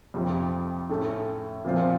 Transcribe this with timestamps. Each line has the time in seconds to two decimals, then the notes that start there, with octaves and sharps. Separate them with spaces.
0.14 F2 C3 F3
0.89 A2 A3 C#4 A4
1.64 A#2 F3 C4 F4 C5